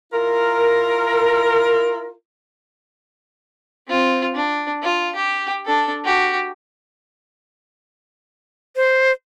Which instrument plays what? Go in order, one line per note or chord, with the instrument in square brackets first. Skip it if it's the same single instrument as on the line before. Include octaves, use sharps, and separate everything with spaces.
[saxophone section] E4 F4 A#4
[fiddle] C4 F4
D4
F4
G4
D4 A4
F#4 G4
[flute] C5